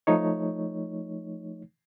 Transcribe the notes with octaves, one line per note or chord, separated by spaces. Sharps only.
F3 A3 D#4 C#5